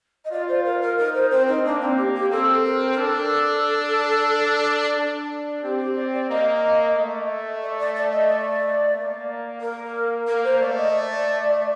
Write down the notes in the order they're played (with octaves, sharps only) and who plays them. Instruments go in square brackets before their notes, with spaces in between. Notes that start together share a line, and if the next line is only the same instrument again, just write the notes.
[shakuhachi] D#5
[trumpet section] F4 [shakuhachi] D5
[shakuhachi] C5
A#4
A#4
[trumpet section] D#4 [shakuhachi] A#4
[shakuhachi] C5
[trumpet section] C4 [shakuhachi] C5
[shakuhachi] D#4
[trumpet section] A#3 [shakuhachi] D4
[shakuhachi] C4
G4
G4
[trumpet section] C4 [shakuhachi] A4
[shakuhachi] A#4
A#4
[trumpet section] D4 [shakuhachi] A4
[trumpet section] D4
[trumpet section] C4 [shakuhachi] G4
[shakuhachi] G4
D5
D5
[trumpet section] A#3 [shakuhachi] D#5
[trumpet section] A3
[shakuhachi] D5
D5
D5
D#5
D5
[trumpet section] A#3
[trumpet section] A#3 [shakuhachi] A#4
[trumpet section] A#3 [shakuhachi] A#4
[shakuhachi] C5
[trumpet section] A3 [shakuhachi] D5
[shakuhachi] D#5
D5